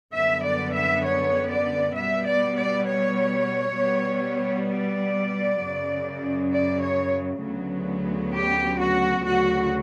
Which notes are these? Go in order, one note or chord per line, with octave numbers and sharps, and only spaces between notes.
F#2 D3 G3 B3 E5
D5
E5
C#5
D5
B2 G3 B3 E5
D5
D5
C#5
B2 G3 B3
D5
F#2 C#3 F#3
D5
C#5
D2 C#3 F#3 B3
G4
F#4
D2 C#3 F#3 F#4